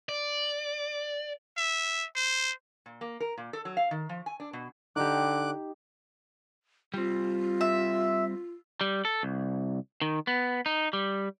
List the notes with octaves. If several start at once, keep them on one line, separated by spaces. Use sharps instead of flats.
D5
E5
C5
A#2
A#3
A#4
A#2
A4
F#3
F5
D#3
F3
G#5
D4
B2
D3 D#4 G4 D6 F#6
G3 C4 F4
E5
G3
A4
C2
D#3
B3
D#4
G3